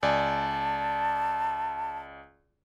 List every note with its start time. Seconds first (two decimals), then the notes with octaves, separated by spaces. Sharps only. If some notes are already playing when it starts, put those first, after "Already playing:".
0.03 C#2 D5 G#5 A5